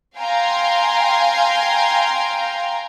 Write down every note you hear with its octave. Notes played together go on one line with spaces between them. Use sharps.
F5 G5 G#5 A#5 C6